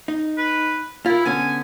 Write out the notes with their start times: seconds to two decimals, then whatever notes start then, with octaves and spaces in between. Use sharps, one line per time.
0.08 D#4
0.38 B4
1.06 E4 F4 A#4
1.25 D3 B3 C#4 G#5